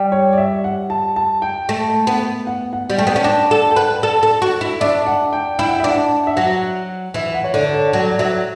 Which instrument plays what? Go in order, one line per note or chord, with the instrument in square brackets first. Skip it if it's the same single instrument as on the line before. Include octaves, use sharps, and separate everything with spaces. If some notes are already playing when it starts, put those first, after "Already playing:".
Already playing: [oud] G3
[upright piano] C#5
D5
E5
F#5
A5
A5
G5
[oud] A3
B3
[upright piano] F#5
F#5
[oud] G3
[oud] A3 [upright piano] G5
[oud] B3 [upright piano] F#5
[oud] C#4 [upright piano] G5
[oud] D4 [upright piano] A5
[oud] A4 [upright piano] F#5
[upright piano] G5
[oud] B4 [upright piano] F#5
[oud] A4 [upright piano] D5
[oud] A4
F#4
E4
[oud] D4 [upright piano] E5
[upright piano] F#5
G5
[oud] E4 [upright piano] G5
[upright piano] F#5
[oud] D4 [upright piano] E5
[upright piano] F#5
E5
[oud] F#3 [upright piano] F#5
[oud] E3 [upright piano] E5
[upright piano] F#5
C#5
[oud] D3 [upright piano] D5
[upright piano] C#5
[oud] F#3 [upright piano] D5
[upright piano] D5
[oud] F#3 [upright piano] E5